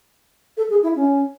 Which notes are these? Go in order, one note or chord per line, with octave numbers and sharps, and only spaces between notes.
A4
G#4
E4
C#4